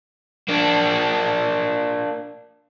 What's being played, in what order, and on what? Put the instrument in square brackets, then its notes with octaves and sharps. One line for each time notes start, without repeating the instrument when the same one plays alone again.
[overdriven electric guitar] A#3 D4